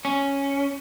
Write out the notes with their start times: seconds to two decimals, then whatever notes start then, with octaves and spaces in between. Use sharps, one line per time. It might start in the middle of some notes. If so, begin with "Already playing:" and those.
0.05 C#4